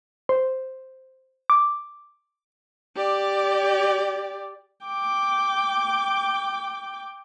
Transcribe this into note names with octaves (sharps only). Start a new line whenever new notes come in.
C5
D6
G4 D5
G5 D6